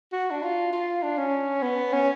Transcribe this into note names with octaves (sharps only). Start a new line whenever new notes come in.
F#4
D4
F4
F4
D4
C#4
B3
C#4